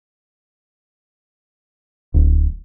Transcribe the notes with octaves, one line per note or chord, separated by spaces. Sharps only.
D1